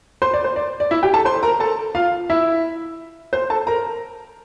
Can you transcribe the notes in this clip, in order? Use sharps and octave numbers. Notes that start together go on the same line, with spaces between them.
C5 C6
D5
C5
D5
D5
E4 E5
G4 G5
A4 A5
C5 C6
A#4 A#5
A4 A5
F4 F5
E4 E5
C5 C6
A4 A5
A#4 A#5